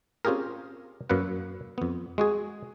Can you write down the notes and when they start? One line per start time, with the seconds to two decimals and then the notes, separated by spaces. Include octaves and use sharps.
0.25 C4 C#4 F4 G4 G#4 A#4
1.09 F#2 F#3 A#3 B4 F#5
1.78 F2 B3
2.18 G#3 F#4 G#4